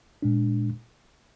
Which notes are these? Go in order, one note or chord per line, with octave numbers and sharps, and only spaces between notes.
A#2 G#3 D4